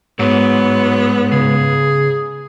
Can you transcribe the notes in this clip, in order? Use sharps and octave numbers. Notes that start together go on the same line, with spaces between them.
G#2 F#3 B3
C#3 G#4